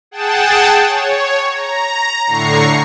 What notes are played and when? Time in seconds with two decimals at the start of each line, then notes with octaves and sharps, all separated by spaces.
0.11 G#4 F#5 G5 A5 E7
0.86 C#5
1.51 A#5
2.27 A2 D3 A#5 C#6 C7